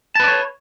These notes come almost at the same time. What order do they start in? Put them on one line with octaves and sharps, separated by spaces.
A5 B4 D5 C#5